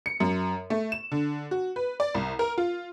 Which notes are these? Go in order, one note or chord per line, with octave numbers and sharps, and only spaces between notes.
C#7
F#2
A3
E7
D3
F#4
B4
D5
C2
A#4
F4